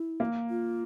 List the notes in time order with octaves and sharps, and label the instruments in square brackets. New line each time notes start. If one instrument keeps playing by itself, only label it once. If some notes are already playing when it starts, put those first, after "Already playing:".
Already playing: [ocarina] E4
[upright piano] A#3
[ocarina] F4